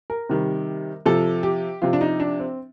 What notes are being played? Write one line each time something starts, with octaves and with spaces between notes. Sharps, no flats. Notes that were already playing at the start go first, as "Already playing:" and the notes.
A#4
C3 D#3 G3
C3 F3 A4
G4
C3 F3 F4
D4
D#4
D4
C4